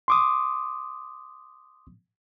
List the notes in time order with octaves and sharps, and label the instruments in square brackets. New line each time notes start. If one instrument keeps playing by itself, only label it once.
[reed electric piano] C6 D6 D#6